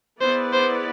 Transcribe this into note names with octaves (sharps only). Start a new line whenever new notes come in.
B3 E4 G#4 B4 C5 D5
C5